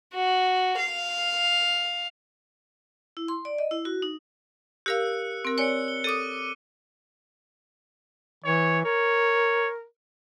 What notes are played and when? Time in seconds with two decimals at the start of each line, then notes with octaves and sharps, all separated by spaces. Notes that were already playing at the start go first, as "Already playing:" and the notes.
0.13 F#4
0.78 F5
3.17 E4
3.28 C6
3.45 D5
3.58 D#5
3.71 E4
3.85 F#4
4.02 D#4
4.86 G4 A#4 F5 E6 F#6 C#7
5.45 C4 A#4
5.58 C#5 D5 G#5 C#7 G7
5.88 G7
6.04 A4 D6 D#6 D#7
8.44 E3 C#5
8.85 A#4 C#5